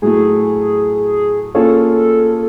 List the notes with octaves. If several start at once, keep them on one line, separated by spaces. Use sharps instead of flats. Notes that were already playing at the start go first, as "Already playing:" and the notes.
A2 F#3 A3 G#4
A#3 C#4 F4 G#4 A4 C#5